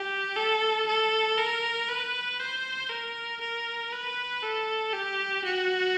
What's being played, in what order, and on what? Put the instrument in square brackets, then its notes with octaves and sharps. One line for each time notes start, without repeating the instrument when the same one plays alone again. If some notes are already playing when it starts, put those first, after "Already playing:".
Already playing: [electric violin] G4
A4
A4
A#4
B4
C5
A#4
A#4
B4
A4
G4
F#4